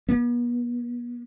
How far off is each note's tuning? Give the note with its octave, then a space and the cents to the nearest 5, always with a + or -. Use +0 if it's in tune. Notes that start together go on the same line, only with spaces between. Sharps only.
B3 -40